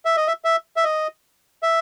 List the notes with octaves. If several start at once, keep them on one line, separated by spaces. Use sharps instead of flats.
E5
D#5
E5
E5
E5
D#5
E5